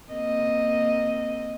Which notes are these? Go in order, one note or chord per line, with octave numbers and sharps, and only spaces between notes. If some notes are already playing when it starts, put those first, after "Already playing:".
A#3 C4 D#5